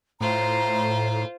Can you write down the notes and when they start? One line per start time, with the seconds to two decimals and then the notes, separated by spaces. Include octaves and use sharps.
0.21 A2 F4 C5 A#5